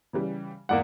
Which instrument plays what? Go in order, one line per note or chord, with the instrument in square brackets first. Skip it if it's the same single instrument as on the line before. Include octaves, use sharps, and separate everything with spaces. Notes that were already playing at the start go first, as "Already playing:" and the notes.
[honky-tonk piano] C#3 E3 G3
[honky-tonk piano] E2 G#2 [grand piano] A#3 D5 F#5